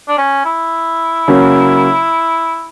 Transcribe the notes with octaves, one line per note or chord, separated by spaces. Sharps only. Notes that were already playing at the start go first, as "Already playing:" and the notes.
D4
C#4
E4
C#3 F#3 A#3 C#4